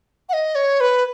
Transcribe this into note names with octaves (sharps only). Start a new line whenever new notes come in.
F#5
D#5
C#5
B4